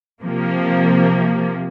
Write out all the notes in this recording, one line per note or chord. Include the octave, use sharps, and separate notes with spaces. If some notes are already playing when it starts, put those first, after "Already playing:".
C3 F3 A#3